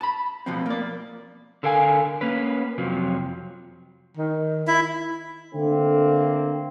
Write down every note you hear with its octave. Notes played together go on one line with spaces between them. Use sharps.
A5 B5
B2 F3 C4
A#3 D5
D3 A4 A#4 F5 G#5
A#3 C#4 B4
F2 C3 F3 F#3
D#3
E4 E5
D3 A3 A#3 C4